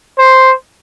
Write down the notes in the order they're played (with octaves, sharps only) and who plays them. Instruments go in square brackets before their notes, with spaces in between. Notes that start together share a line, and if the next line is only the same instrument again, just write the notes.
[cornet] C5